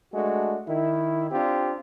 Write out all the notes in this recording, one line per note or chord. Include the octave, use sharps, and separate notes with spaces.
G#3 A3 D4 F#4
D#3 E4
C4 D4 F4 G4